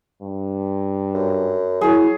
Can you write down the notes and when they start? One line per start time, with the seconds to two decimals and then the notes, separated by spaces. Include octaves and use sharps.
0.22 G2
1.14 F#2
1.81 F#3 E4 G#4 C#5